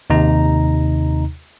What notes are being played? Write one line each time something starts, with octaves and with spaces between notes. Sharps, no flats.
D#2 C3 D#4 A#5